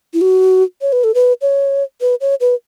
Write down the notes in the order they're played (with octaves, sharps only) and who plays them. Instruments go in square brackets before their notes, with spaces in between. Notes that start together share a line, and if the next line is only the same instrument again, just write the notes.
[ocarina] E4
F#4
C#5
B4
A4
B4
C#5
B4
C#5
B4